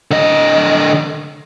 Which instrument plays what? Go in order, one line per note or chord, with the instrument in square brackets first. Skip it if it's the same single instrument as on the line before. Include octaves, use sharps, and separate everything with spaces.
[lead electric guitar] D3 D#5